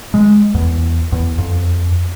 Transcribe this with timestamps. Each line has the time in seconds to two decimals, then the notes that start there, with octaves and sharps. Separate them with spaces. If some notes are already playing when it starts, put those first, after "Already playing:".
0.14 G#3
0.54 E2
1.12 E2
1.38 F2